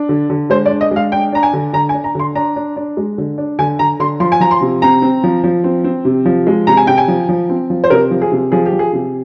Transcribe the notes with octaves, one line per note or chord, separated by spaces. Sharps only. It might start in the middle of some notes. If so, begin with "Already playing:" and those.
Already playing: D4
D3
D3
G#3 C5
D5
D4
D#5
G#3 F5
D4 G5
D4 A#5
G#5
D3
D3 A#5
G#5
D4
A#5
D3 C6
D4 A#5
D4
D4
G#3
D3
D4
D3 G#5
D3 A#5
D3 C6
F3 C6
G#5
F3 A#5
C6
C3
C4 A#5
C4
F3
F3
C4
C4
C3
F3
G#3
C3 A#5
G#5
C3 G5
G#5
F3
F3
C4
F3
C5
C3 A#4
F3
G#4
C3
F3 G#4
G4
F3
G#4
C3